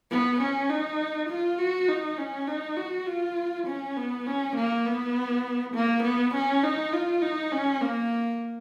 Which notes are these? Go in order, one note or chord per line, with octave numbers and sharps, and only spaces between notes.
B3
C#4
D#4
F4
F#4
D#4
C#4
D#4
F#4
F4
C#4
B3
C#4
A#3
B3
A#3
B3
C#4
D#4
F4
D#4
C#4
A#3